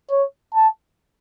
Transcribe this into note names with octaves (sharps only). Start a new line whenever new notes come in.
C#5
A5